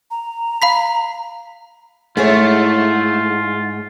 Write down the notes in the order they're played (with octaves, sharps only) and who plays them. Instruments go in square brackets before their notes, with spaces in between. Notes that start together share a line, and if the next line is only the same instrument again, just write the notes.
[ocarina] A#5
[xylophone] F5 B5 B6
[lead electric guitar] G#2 [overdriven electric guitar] A3 [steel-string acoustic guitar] E4 G#4 C#5 [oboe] F4